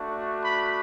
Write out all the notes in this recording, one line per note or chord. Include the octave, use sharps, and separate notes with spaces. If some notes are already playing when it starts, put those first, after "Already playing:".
Already playing: A3 D4 F#4
B5